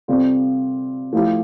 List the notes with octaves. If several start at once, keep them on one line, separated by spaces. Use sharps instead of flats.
C3 G3 C4 F4 A4
F3 A3 E4 G4